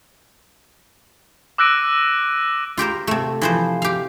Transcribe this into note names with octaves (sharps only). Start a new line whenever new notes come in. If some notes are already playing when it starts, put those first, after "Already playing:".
D6 E6 F#6 A#6 D7 D#7
F4 G4 A#4 C5
C3 A3
E3 F3 C5
G4 F5